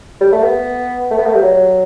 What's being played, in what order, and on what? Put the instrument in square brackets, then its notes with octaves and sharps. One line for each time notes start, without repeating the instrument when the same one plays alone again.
[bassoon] G3
A3
B3
A3
B3
A3
G3
F#3